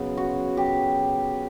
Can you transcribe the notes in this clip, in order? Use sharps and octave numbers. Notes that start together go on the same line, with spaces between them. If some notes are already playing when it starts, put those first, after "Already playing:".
Already playing: C#3 F#3 B3
F#4
G4